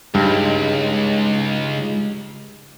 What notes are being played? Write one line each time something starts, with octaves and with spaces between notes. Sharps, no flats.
C#2 G2 G#3 D#4